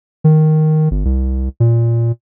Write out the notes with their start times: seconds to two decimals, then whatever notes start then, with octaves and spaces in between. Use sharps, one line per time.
0.24 D#3
0.91 G1
1.05 C2
1.60 A#2